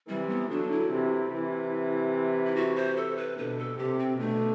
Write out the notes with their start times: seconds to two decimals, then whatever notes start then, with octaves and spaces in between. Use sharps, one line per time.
0.08 C3 E3 G3
0.30 B3
0.50 D3 F#3 D4
0.71 E4
0.91 C3 E3
1.32 C3 E3
2.45 E4
2.56 F#4
2.76 C5
2.96 A4
3.17 B4
3.37 B2 D3 B4
3.59 A4
3.78 C3 G4
3.99 C4
4.19 B2 D3 A3